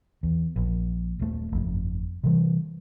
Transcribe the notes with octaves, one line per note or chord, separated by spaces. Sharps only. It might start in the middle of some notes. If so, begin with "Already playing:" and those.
E2
A#1
D#1 A3
G1 F2
C3 E3 G3